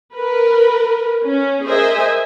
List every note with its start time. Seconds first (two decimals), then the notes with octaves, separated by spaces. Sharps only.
0.15 A#4 B4
1.23 C#4
1.65 G#4 A#4 C5 D#5 E5 G#5